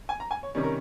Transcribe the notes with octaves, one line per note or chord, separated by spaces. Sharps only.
G#5
A#5
G#5
C#5
C3 D#3 G3 C#4
A#4